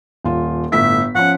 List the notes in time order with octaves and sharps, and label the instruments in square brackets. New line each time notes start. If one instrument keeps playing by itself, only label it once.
[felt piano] D#1 F4
[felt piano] G1 A2 B6 [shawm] E5
[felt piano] F3 C#4 [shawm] F#5